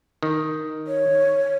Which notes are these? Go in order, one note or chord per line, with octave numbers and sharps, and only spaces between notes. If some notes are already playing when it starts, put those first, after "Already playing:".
D#3
C#5